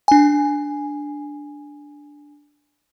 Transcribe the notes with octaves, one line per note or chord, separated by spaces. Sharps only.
D4 G#5